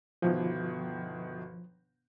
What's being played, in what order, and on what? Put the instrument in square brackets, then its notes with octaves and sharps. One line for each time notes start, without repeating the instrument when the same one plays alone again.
[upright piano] G1 B2 D#3 [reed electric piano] F3